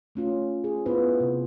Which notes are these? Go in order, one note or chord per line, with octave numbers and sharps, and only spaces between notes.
A3 C#4 F4
G#4
B3 E4 F4 B4 C5
C3